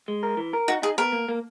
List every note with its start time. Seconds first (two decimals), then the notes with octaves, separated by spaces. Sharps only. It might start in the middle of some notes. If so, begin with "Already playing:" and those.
0.08 G#3
0.23 A#4
0.37 E3
0.53 A#4
0.68 D#4 F#4
0.82 D#4 G#4
0.98 B3 A#4
1.12 A#3
1.29 A#3